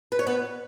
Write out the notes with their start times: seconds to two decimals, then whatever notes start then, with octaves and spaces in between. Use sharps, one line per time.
0.12 B4
0.19 C#5
0.27 B3 B4